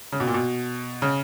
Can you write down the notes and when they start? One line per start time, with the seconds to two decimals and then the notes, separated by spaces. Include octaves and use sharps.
0.12 C#3
0.20 B2
0.27 A#2
0.34 B2
1.02 C#3